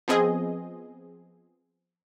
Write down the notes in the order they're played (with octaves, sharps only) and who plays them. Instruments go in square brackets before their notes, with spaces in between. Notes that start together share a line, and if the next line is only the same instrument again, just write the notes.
[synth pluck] F3 B3 C4 G#4 D#5